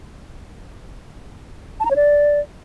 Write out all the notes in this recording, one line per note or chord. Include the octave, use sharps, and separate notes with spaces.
A5
A#5
C#5
D5